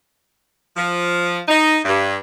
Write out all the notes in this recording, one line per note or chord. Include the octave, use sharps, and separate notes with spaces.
F3
D#4
G2